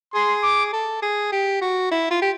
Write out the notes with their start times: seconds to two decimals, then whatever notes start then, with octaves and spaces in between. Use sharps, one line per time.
0.14 G#4 C6
0.43 D6
0.73 A4
1.02 G#4
1.32 G4
1.61 F#4
1.91 E4
2.11 F4
2.22 G4